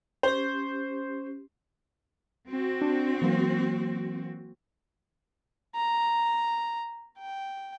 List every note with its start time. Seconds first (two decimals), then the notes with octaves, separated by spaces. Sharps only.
0.23 C#4 G4 C5
2.48 C4 F#4
2.81 D4
3.21 E3 F#3 A#3
5.75 A#5
7.19 G5